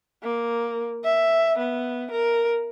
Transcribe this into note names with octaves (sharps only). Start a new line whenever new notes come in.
A#3
E5
B3
A#4